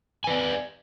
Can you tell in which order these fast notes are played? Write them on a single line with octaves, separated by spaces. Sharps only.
G#5 B4 D5